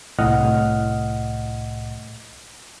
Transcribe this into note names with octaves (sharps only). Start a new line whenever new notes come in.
C2 A2 D#5 F#5 F6